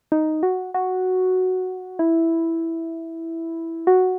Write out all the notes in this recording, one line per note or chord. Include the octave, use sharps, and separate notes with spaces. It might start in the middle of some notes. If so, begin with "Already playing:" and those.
D#4
F#4
F#4
E4
F#4